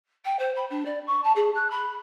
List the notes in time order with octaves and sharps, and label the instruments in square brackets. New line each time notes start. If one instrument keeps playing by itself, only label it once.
[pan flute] G5
C5
B5
D4
D5
C#6
A5
G#4
F#6
B5